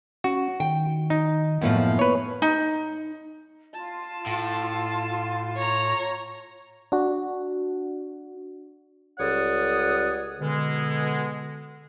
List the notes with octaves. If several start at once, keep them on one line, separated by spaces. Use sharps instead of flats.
C#4 F#4
D#3 G5
D#4
F#2 A2 F3 A#3 B3
B4 C#5
D#4
F4 A5
A2
C#5 A#5
D4 F#4
C#2 G3 A4 C#5 F#5 D#6
B2 D3 G#3